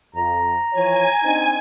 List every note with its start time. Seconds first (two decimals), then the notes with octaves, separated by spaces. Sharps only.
0.15 F2 A#5
0.73 E3 F3 C#5 G#5
1.23 C4 D4 D#4